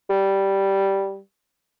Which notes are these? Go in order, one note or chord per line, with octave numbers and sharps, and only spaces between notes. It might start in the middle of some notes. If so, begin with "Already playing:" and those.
G3